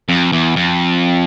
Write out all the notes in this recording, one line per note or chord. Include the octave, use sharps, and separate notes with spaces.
F2
E2
F2